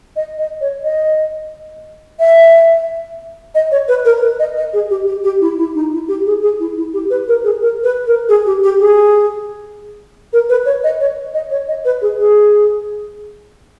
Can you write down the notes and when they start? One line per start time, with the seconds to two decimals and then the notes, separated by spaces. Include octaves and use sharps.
0.16 D#5
0.38 D#5
0.61 C#5
0.84 D#5
2.20 E5
3.55 D#5
3.71 C#5
3.88 B4
4.05 A#4
4.22 B4
4.40 D#5
4.57 D#5
4.73 G#4
4.90 G4
5.07 G4
5.24 G4
5.41 E4
5.58 E4
5.75 D#4
5.93 E4
6.08 G4
6.26 G#4
6.43 G#4
6.60 E4
6.77 E4
6.94 G4
7.10 B4
7.28 A#4
7.44 G#4
7.62 A#4
7.84 B4
8.07 A#4
8.29 G#4
8.46 G4
8.63 G4
8.80 G#4
10.33 A#4
10.49 B4
10.66 C#5
10.84 D#5
11.00 C#5
11.34 D#5
11.51 C#5
11.68 D#5
11.85 B4
12.02 G#4
12.19 G#4